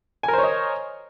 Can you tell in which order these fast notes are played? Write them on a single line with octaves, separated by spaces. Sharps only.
G#5 A#4 C5 C#5 D#5